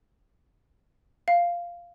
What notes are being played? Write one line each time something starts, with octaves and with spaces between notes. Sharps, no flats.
F5